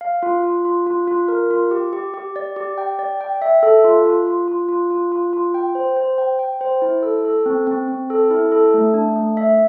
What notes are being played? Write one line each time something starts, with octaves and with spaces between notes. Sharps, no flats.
F5
F4
F4
F4
F4
F4
A#4
F4
G4
G4
G4
D5
G4
G5
D5
G5
E5
A4
F4
F4
F4
F4
F4
F4
F4
F4
G5
C5
C5
G5
G5
C5
E4
A4
A4
C4
C4
C4
A4
E4
A4
A3
D4
A3
E5